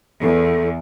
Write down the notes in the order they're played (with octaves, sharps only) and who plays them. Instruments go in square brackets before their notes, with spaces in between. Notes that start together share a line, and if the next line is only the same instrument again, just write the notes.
[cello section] E2 [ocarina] A4